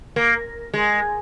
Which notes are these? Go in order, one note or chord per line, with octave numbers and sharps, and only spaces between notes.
A#3
G#3